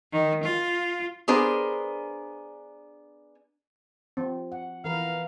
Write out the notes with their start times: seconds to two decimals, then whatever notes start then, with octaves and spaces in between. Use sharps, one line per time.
0.12 D#3
0.43 F4
1.28 B3 D4 G#4 A#4 C5
4.17 F3 C4
4.52 F#5
4.84 E3 A#4 B4 F5